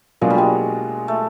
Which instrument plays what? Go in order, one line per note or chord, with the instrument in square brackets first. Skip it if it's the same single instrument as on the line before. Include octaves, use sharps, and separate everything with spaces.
[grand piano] B2 F#3 A#3 D4 F4 [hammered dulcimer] G#3
[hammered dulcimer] G3
G#3
A3